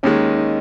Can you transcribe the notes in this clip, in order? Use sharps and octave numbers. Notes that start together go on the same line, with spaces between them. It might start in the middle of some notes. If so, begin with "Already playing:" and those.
D#2 D#3 G#3 C#4
D#4